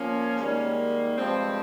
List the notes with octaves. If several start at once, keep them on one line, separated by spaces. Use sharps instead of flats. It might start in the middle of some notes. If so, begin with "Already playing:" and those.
Already playing: A#2 F3 A#3 C#4
G#2 D#3 G3 A#3
G2 F3 G#3 C4